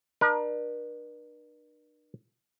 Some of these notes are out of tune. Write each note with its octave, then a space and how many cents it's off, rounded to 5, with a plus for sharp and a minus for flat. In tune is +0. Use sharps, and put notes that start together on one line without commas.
D4 +40 A#4 +45